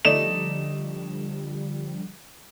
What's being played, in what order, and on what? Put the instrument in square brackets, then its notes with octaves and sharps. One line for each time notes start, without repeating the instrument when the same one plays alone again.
[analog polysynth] D3 F3 G3 [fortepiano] A3 D#4 D5 [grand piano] E7